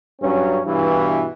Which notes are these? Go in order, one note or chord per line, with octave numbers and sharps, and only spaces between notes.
G2 F#3 C#4
G2 B2 E3